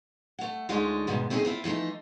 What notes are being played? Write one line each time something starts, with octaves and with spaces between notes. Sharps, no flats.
A3 F#5
D2 D3 G#3 D#4 F4 C#5
D2 G#2 B2 D#3
A3 C4 C#4 D#4 G#4
C4 E4 F4
E3 F3 A3 D#4